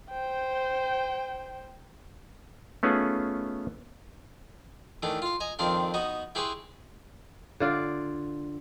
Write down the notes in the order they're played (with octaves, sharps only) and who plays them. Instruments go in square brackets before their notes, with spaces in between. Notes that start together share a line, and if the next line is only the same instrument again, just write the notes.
[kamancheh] C5 G5
[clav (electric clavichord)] A3 B3 C#4 D#4 F4 G#4
[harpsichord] D#3 E3 A3 D4
F4 F5
D#5 G#5 A#5
F2 D#3 C4 D4 F5 C6
B3 D#4 F#4 D#5
E4 G4 G#4 B4 C6 C#6
[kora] D3 F4 D5